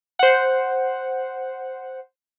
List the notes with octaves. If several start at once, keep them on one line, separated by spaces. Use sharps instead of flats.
C5 F#5